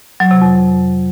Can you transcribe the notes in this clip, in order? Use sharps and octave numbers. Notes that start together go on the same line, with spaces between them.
F#3
C3
F2